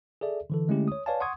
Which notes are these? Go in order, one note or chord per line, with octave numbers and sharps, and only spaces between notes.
G#4 A4 D5 E5
D3 E3 A4
D3 G#3 A3 C#4 E4 G4
C#5 D#6
B4 C#5 D5 F5 G#5 A5
F#5 C6 C#6 D#6 G#6